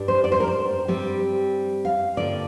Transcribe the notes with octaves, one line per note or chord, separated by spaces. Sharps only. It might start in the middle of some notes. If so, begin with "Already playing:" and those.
Already playing: G2 G3 D4
C5
D5
C5
A#4
C5
G2 G3 C4
F5
G2 D3 A#3 F4 D5